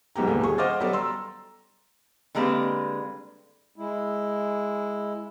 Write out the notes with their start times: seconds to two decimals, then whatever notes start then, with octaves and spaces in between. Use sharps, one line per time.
0.16 B1 G#2 B3 G4 A#5
0.27 D#2 A#2 D3 G#3 A3 B3
0.43 D#1 G#4 C#6
0.58 C5 D#5 F#5 D6 F6 A6
0.80 F#3 G3 B3 A4 D5
0.93 A#5 C6 E6
2.35 D3 G3 G#3 A#3 C4 B4
3.76 G#3 E4